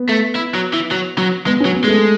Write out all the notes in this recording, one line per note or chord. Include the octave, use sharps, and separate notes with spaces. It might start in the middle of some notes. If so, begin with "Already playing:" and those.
Already playing: B3
A3
E4
F#3
E3
F#3
F#3
G#3 B3
C#4
F#3
B3
G#3 A3